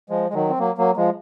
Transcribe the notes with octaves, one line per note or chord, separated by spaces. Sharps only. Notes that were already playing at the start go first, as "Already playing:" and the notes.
F3 G#3
G#3
D#3 F#3
C4
F#3 A#3
F#3 A#3
F3 G#3